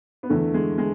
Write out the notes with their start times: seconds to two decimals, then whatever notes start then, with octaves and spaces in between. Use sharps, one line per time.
0.23 B3
0.30 E2 D3 A3
0.54 G#3
0.78 G#3